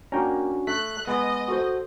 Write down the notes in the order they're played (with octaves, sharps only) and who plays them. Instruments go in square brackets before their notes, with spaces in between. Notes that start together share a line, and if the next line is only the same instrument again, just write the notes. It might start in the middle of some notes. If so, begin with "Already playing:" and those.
[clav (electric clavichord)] A#3 G5 A#5 [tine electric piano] C#4 D4 F#4
[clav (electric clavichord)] A3 [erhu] F#6 [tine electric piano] B6
[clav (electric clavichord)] G#3 B3 [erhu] D#5
[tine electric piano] F#4 A4 C5